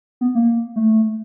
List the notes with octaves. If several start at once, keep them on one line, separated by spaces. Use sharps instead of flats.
B3
A#3
A3